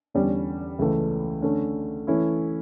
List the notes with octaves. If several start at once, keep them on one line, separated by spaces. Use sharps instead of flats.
E2 D3 G3 C#4
C#2 C#3 E3 A3
D3 A3 C#4
E3 A3 C#4 E4